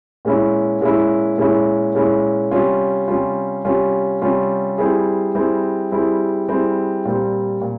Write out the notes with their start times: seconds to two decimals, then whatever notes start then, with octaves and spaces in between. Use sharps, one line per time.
0.25 A#2 G#3 C#4 E4
0.81 A#2 G#3 C#4 E4
1.38 A#2 G#3 C#4 E4
1.95 A#2 G#3 C#4 E4
2.51 C3 G3 C#4 F4
3.08 C3 G3 C#4 F4
3.65 C3 G3 C#4 F4
4.22 C3 G3 C#4 F4
4.78 G3 C4 E4 G#4
5.35 G3 C4 E4 G#4
5.92 G3 C4 E4 G#4
6.48 G3 C4 E4 G#4
7.05 A#2 G3 C4
7.62 A#2